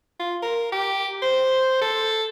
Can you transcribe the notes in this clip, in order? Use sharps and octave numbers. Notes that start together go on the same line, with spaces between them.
F4
A#4
G4
C5
A4